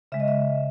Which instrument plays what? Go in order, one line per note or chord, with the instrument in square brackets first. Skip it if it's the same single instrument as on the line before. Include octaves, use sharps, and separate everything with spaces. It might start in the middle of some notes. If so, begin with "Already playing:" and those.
[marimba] C#3 G#3 E5
D#5
E5